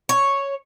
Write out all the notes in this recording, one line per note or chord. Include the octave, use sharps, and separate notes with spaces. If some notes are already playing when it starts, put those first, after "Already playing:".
C#5